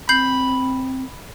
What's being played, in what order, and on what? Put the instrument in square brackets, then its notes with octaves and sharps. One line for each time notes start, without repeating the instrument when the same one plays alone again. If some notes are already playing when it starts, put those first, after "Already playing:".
[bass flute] C4 [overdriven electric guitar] B5 [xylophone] G6 C7 F#7